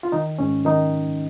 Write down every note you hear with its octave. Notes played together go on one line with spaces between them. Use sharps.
F4
D#3 D#4
G#2 C#4
D#3 D#4